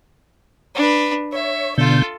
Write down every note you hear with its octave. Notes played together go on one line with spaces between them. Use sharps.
D4 B4
C#5 E5
B2 D3 F4 A4 G6